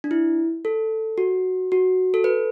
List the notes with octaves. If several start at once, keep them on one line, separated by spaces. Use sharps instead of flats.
D4
E4
A4
F#4
F#4
A4
B4